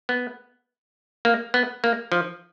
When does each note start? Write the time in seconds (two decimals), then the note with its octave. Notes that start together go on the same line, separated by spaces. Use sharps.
0.09 B3
1.25 A#3
1.54 B3
1.84 A#3
2.12 F3